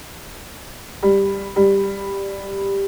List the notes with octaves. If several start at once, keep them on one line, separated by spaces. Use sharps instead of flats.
G3
G3